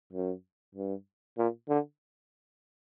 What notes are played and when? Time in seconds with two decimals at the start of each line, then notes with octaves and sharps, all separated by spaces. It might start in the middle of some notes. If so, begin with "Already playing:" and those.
0.13 F#2
0.75 G2
1.38 A#2
1.69 D3